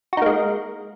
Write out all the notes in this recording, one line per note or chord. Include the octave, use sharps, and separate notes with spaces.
G#3 A#3 D#4 F#4